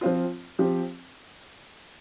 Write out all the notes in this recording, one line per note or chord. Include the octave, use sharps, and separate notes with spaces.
F3 C4 F4
F3 C4 G4